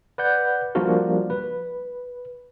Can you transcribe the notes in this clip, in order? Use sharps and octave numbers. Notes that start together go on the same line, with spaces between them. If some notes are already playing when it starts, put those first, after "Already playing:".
B4 D5 F#5 G6
F3 G3 A#3 D4 F#4 A#4
B4